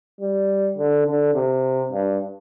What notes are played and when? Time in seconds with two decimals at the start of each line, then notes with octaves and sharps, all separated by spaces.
0.20 G3
0.78 D3
1.06 D3
1.34 C3
1.92 G2